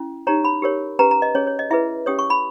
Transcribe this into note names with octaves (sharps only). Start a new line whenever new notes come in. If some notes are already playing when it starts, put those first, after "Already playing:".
Already playing: C#4 E4
D#4 G4 C#5 A#5
B5
G4 A#4 C#5
C#4 G4 B4 A#5
A#5
D#5
C#4 G#4 C#5
C#5
D#5
E4 G#4 B4 E5
C#4 G4 C#5 D#6
C#6
B5